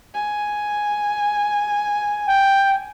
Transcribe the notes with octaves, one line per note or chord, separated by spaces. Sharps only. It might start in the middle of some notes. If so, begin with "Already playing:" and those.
G#5
G5